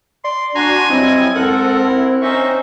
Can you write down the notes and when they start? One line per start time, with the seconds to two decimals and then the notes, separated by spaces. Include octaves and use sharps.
0.24 D5 C6
0.55 D4 F#4 G#5 A#5 C6
0.90 F#3 G3 C4 E4 D#5
1.35 G#2 C4 A4 A#4 F#5
1.85 E4
2.22 C#4 D#4 C5 E5 C#6